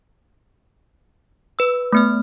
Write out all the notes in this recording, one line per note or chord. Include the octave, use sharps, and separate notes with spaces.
B4 E6
A3 B3 F6